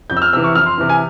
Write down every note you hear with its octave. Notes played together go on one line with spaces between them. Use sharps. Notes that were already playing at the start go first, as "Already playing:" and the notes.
F2 G6
E6
F6
C3 E3 E6
C#6
F2 F6
C6
C3 E3
G#5